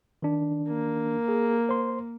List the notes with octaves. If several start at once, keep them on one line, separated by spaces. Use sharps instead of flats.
D#3 D4
A#3
G#4
C5 C6